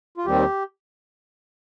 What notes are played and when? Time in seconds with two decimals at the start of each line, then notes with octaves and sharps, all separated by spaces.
0.18 F4
0.26 D#2 D#3 G3 C4 G4